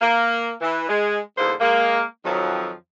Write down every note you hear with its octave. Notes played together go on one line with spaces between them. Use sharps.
A#3
E3
G#3
E2 G#2 D3 A#3 C5
G#3 A#3
F2 D#3 F3 F#3